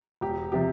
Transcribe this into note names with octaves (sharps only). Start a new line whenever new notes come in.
E1 G4
C3 F3 C4 G4